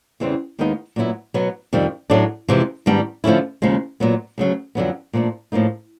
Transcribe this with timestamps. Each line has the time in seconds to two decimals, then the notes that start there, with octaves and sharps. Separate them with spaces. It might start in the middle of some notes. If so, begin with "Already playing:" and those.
0.20 E2 C#3 E3 G3 C4
0.59 D#2 D#3 G#3 B3 D#4
0.96 A#2 F#3 B3 E4
1.34 B2 F#3 B3
1.73 F2 C3 D#3 G3
2.10 A2 F#3 A3 D4
2.48 F2 C3 E3 G#3
2.86 G#2 D#3 G3 B3 D4
3.24 D3 F3 A3 C#4 E4
3.62 D#2 C#3 F3 G#3
4.00 A#2 F#3 B3
4.38 D2 C#3 F#3 A3
4.75 F2 D3 F#3 B3
5.13 A#2 F3 A3 D4
5.52 A2 F3 A#3 D#4